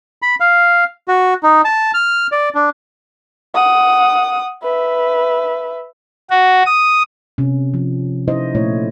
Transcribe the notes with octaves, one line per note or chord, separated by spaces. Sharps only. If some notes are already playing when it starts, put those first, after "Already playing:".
B5
F5
F#4
D#4
A5
F6
D5
D4
F#5 D#6
B4 E5
F#4
D#6
C3 C#4
F3
C#4 D#4 E4 C5 D#5
A#2 A3 E4 C#5